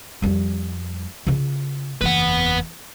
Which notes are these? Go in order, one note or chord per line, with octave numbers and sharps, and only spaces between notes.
F2 G3
C#3 F4
F#1 E2 B4 F#5